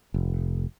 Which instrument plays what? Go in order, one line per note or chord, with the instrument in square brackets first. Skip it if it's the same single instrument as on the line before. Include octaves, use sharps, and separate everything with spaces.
[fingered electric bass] F1